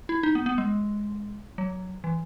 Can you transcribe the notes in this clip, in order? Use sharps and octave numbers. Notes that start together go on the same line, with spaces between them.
E4
D#4
B3
B3
G#3
F#3
E3